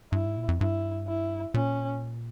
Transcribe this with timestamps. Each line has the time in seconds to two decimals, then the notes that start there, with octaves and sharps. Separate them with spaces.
0.12 G2 E4
0.25 G#2
0.37 A#2
0.48 F2
0.60 G2 E4
1.07 E4
1.54 A#2 C#4